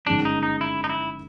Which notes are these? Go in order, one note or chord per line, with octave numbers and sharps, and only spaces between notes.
G1 F#2 D#3 G#3 C#4 D4
D#4
D#4
E4
D#4
E4